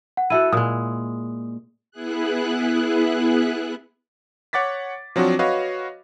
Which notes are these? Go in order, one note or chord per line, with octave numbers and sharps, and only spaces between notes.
F#5
E4 F#4 A4 E5 F#5 D#7
A#2 G#3 D#6
B3 E4 G#4 F#6
C#5 F#5 D6 A6 B6
F3 F#3 C4 D4 F#4
F#4 B4 C#5 D#5 F5